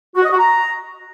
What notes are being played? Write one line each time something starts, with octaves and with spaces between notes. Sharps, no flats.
F#4
D#5
F#4
A#5